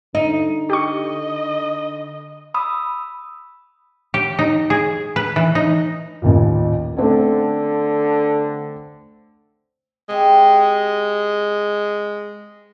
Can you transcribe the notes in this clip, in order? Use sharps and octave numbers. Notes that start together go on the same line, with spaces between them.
D3 D#4
G4 D#5 C#6
B5 D#6 E6
G4
D#4
G#4
B4
E3
D#4
A1 D#2 A#2
D3 A3 C4 C#4
G#3 C4 G4